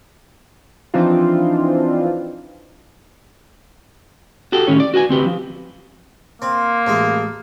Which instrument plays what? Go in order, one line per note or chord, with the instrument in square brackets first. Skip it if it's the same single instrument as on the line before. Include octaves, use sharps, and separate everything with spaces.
[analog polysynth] E3 F3 C4 D4 D#4 F4
[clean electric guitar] F#4 G4 A4 G5
A2 D#3 C#4 C#5
D5
F#4 B4 G5 G#5
D2 C4 G4 B4
F3
[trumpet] A#3 [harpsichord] C4
[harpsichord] A1 G#3 E4